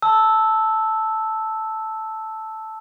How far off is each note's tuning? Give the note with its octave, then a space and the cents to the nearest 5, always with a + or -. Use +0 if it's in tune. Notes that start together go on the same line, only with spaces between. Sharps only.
A5 +0 E6 -5